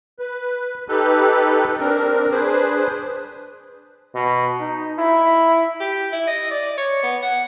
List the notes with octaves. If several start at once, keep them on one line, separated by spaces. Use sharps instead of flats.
B4
D#4 G4 A4 B4
C4 D4 A#4
D4 G#4 B4 C5
B2
D#4
E4
G4
E4
D#5
D5
C#5
B3
F#5